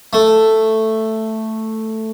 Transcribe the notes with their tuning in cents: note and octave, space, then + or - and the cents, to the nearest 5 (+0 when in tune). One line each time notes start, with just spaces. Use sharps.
A3 +5